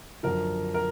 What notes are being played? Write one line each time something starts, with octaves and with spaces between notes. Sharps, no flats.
F#2 D3 F3 A#4
A#4